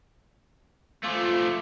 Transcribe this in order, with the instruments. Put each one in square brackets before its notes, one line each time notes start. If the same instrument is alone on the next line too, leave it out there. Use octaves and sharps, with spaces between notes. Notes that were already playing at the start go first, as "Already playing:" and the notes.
[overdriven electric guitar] F3 A3 [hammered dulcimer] F4 G#5 D6